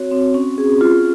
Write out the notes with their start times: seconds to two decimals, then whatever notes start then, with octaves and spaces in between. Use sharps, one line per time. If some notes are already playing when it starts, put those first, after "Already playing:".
Already playing: C4 F#4 C#5
0.11 C4
0.34 C#4
0.58 G#4
0.81 F4